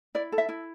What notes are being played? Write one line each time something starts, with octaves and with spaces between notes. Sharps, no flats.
E4 D5
A4
E5
E4